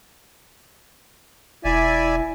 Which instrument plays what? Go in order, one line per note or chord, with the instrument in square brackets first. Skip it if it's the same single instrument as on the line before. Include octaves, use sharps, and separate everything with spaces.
[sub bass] E1 [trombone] E4 [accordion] D5 E5 G#5